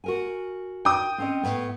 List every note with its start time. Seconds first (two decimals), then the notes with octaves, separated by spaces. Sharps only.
0.04 F#4 A#4 G#5
0.85 G5 D#6
1.18 C4 C#4 D#5
1.43 A2 B3